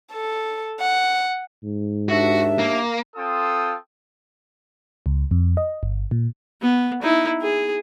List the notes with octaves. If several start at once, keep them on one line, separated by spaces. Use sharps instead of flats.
A4
F#5
G#2
D#2 D4 F#4 E5
A#3
C4 F4 A4 G5 A5 D#6
C#2
F2
D#5
G1
A#2
B3
D#4 E4
G#4